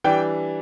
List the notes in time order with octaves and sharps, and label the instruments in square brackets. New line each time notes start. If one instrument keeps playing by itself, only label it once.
[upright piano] E3 G3 D4 G5